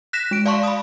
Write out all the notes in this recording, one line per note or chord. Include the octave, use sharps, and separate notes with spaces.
F#6 A#6 B6 E7
G#3 D7
D5 F5 A5 C6 C#6
B5 D#6